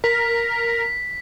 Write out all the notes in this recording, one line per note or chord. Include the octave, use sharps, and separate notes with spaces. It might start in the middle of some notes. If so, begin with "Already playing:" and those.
A#4 B6